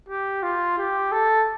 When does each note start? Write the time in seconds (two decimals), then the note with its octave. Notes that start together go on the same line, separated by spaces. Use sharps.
0.09 G4
0.43 F4
0.78 G4
1.12 A4